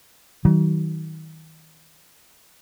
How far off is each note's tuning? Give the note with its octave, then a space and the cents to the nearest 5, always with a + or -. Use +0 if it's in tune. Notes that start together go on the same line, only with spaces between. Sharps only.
D#3 +35 F#3 +35